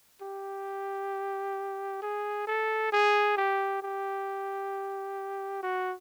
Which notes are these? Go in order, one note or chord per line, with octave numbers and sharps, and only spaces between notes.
G4
G#4
A4
G#4
G4
G4
F#4